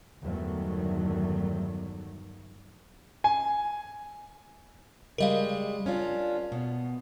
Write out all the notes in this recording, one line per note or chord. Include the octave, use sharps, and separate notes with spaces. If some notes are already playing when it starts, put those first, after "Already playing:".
G1 E2 D#3 F#3 G3 A3
G#5
C#3 G3 G#3 A#4 D#5 F5
C#4 D4 F4
B2